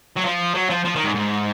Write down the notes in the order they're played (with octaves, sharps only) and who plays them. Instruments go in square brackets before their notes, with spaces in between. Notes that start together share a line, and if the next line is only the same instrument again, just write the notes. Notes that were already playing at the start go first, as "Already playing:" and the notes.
[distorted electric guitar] F#3
F3
F#3
F3
F3
D#3
G#2
G#2